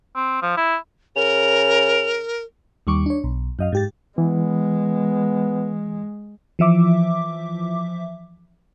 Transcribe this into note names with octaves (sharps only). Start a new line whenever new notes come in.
C4
F3
E4
C#3 A#4 F7
D#2 G3 C#6 D6
D4 C#5
B1
F#2 D#5 F5
G#2 G4 A6
E3 G#3 B3
E3 F3 E5 D6